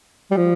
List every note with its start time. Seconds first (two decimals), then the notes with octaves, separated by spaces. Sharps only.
0.31 G3
0.37 F3